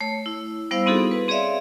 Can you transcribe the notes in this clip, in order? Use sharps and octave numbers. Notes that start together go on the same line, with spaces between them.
A3 C#5
E4
G3 B3 E4 C5 F5 E6
B3 C4 D#4 F#4 G#4 A4
B4
C4 G#4 C#5 D5 E5 F5